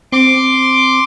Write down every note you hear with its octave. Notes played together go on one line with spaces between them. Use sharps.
C4 C6 D6